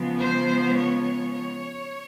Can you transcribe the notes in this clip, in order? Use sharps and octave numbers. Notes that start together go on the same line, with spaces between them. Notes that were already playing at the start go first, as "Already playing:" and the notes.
Already playing: C#3 F3 G#3 B3
C5
C#5
C#5